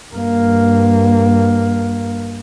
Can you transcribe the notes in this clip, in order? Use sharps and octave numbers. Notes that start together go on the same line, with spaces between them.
G2 A#3